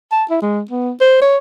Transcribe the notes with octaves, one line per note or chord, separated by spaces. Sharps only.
A5
E4
G#3
B3
C5
C#5